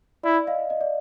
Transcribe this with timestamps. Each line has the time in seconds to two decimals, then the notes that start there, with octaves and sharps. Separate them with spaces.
0.23 E4 D5 E5
0.47 D#5 F5
0.70 D#5
0.81 D5